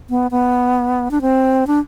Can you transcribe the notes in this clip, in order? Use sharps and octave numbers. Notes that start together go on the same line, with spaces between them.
B3
B3
D4
C4
D4